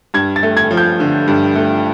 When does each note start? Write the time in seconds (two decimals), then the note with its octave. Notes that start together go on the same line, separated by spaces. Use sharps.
0.14 G2 G#6
0.36 A6
0.43 A3
0.57 G#6
0.71 F3
0.77 G6
1.00 D3
1.28 G2
1.56 A3